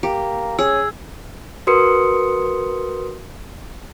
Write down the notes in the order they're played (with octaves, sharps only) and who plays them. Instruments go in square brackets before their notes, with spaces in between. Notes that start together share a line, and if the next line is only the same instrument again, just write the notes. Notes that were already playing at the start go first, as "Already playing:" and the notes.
[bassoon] A#3 [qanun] G4
[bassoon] C#4 [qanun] G#4 [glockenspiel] E6
[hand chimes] F#4 A#4 B4 C6 D#6 C#7